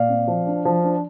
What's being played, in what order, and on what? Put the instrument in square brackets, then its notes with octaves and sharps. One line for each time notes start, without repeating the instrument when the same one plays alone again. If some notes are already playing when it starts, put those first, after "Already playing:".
Already playing: [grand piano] A#2 D5 F5
C4
F3
D4
F3
D4